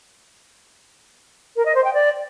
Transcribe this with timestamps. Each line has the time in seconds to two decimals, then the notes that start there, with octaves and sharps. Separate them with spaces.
1.56 A#4
1.65 D#5
1.75 C5
1.84 G5
1.94 D5